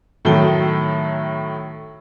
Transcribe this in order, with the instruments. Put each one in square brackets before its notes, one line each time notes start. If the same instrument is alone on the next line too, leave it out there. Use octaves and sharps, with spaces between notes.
[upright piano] A2 D#3 F#3 A4 G7